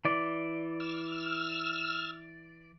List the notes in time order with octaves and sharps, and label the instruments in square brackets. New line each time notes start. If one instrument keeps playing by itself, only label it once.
[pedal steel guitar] E3 D5
[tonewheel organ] E6 F6